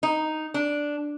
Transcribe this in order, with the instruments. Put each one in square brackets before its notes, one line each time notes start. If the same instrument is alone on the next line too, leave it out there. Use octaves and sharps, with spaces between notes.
[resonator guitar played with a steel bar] D#4
D4